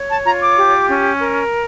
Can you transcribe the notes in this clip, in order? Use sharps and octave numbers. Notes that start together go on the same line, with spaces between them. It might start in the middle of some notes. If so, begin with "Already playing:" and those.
Already playing: C#5
A5
F4 A#5
D6
G4
C#4
A#4